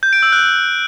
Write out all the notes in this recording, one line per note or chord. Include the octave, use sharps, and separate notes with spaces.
G6
D7
E6
F#6